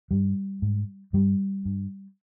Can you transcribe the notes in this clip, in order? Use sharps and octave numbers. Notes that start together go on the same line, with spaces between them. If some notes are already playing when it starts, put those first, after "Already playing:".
G2 G3
G#2
G2 G3
G2